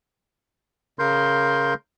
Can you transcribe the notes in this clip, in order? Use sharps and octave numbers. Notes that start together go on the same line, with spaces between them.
C#3 A#4 C6 G6